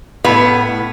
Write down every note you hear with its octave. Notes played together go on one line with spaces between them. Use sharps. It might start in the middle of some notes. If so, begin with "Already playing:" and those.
A2 B3